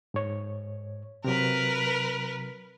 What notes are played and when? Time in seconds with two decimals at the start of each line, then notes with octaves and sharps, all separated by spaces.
0.14 G#2 C#5
1.24 C3 F#3 A#4 B4